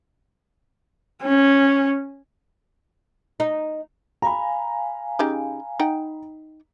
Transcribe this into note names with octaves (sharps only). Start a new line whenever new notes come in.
C#4
D#4
F5 G#5 A#5 B5
C#3 D#4 G4
D#4 F#5 G5